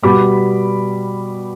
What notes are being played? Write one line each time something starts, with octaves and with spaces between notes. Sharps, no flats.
B2 G3 B3 B5 D6